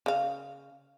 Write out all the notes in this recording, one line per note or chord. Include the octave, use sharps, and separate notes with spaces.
C#3 F5